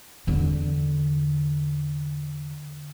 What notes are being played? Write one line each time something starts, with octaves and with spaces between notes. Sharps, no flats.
E2 D3